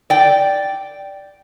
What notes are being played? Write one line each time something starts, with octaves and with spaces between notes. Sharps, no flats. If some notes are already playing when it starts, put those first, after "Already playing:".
D5 G5